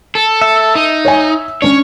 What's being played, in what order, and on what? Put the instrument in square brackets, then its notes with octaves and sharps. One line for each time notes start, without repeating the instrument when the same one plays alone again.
[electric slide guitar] A4
[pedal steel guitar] E5
[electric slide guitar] D#4
[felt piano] C#5 G#5
[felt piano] C#4 D4 [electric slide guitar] C#5